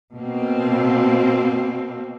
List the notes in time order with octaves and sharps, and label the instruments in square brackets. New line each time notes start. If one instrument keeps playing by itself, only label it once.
[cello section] B2 A#3 C4